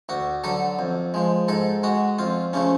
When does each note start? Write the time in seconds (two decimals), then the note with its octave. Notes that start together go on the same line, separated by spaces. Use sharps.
0.09 D2 F#4
0.44 D3 F#3 A4
0.79 F2
1.14 F3 G#3
1.48 G#2 A4
1.83 G#3 F#4
2.19 F2 F4
2.53 C#3 F3 A3 C#4